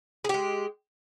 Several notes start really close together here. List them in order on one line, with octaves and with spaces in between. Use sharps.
G#4 G4 G#3